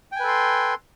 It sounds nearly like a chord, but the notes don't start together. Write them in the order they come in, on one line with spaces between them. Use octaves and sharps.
G5 G#5 B4 A4 C6